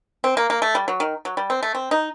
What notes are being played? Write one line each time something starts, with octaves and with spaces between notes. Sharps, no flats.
C4
A#3
A#3
A3
G3
F#3
D#3
F#3
G3
C4
A3
C4
D#4